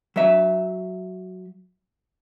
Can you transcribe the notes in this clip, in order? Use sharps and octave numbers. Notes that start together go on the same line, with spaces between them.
F#3 E5